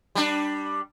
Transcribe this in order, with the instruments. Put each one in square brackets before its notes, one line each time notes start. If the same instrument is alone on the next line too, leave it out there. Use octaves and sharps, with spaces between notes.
[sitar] G3 D4